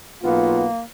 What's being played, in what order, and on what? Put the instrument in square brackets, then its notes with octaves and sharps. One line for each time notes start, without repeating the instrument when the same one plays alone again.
[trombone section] B1 B3 F4 [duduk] A#3